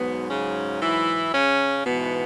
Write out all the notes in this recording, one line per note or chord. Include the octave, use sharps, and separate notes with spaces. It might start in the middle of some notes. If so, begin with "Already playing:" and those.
Already playing: G#2 B2 F#3 B3
C#3 C#4
E3 E4
C#3 C#4
G#2 B2 E3 B3